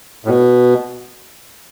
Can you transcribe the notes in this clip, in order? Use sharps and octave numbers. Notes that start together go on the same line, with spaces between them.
A2
B2